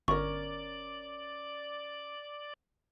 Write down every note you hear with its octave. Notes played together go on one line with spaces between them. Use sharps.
G1 C#4 A#4 D5 C#6